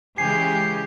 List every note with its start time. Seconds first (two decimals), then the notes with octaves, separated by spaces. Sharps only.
0.18 C#3 E3 G#3 G4 G#5 C7